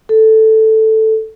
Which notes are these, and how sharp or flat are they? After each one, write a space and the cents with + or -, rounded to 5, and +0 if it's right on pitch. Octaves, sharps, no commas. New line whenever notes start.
A4 +0